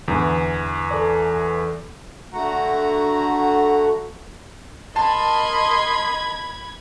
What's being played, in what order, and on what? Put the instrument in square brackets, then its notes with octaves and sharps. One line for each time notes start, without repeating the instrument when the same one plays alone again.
[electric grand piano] E2 E3 [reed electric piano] G#2 D3
[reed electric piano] A4 D5
[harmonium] D3 A3 F#4 F#5 A#5
[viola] A#4 D#5 [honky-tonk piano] A5 [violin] B5 G#6 [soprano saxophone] C6